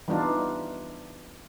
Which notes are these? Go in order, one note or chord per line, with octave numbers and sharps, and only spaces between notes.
E3 G3 B3 D4 D#4 F4